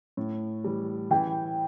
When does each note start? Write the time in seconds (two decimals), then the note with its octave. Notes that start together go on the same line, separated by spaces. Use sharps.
0.17 A2
0.64 E3 G3
1.10 E3 G5